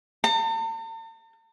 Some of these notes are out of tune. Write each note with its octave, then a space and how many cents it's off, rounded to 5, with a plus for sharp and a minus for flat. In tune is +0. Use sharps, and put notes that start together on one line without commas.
A5 +45